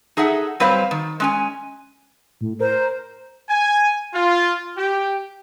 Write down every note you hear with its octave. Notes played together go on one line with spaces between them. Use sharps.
D#4 G#4 A4 E5 F#5
F#3 G3 C4 B4 C5 F5
D#3
G#3 C#4 G#5
A2
A#4 C5
G#5
F4
G4